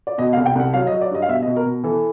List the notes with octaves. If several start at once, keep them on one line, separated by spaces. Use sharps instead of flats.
D5
B2 D#5
F5
C2
G5
C2 F#5
F#3 F5
D#5
F#3
D5
G2 D#5
F5
B2 E5
D#5
B2
A#4
B2
E3 A4